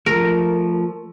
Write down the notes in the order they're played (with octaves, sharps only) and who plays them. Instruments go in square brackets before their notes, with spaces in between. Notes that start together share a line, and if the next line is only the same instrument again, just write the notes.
[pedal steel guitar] F3 A3 [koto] A#4